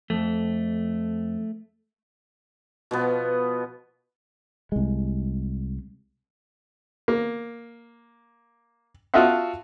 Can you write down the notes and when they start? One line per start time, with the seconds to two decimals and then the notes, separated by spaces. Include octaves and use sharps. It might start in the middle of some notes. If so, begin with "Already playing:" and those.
0.10 F2 A3
2.91 B2 F3 B3
4.72 C2 G#3
7.08 A#3
9.14 F4 F#4 A4 D#5 E5 F#5